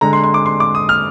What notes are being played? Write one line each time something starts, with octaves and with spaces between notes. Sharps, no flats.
D3 G#3 A#5
C6
C6
D6
C6
D6
D#6
F6